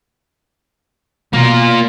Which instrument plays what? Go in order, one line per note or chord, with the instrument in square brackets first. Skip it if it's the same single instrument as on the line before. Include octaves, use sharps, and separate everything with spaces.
[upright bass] B2 [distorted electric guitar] A#3 F4